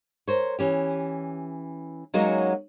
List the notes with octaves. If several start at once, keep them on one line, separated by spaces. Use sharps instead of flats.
A#4 C5 C#5
E3 C#4 G4
F#3 G#3 A#3 C#4 D#4 F#4